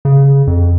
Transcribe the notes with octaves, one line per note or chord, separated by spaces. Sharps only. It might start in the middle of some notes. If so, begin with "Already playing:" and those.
C#3
F2